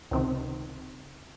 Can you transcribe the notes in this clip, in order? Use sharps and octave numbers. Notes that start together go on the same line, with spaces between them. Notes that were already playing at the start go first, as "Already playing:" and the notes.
C#2 C3 D#3